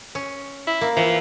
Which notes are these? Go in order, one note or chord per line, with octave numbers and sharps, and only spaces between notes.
C#4
E4
A#3
E3 F3